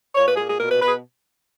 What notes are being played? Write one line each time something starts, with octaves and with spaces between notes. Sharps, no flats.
A#2 C#5
B4
A#2 G#4
G#4
B2 A#4
B4
B2 B4
G#4